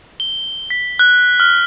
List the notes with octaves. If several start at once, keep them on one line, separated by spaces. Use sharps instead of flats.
G7
B6
F#6
F6